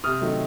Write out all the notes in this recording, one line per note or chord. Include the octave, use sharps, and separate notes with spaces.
C3 D#6 F6
D#3 F#3 A3